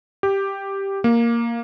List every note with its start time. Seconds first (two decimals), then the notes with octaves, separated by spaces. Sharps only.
0.23 G4
1.04 A#3